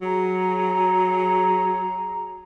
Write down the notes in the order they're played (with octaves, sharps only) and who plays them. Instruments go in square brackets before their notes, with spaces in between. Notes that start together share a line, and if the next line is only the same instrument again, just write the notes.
[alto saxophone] F#3 [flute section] G#4 A#5